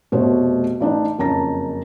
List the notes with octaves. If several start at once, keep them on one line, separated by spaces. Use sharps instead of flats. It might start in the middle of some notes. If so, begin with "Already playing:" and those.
F1 B2 A3 F#4 C5 C#5
A1 D4 D#4
F#1 F2 C#4 A5 A#5 A#6